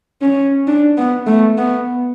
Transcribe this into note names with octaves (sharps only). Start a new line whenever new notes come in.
C#4
D4
B3
A3
B3